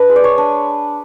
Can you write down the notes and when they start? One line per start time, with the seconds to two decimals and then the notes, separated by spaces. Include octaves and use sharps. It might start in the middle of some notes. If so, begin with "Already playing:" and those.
Already playing: D4 B4
0.09 G#3
0.16 D5
0.24 C#5
0.38 D4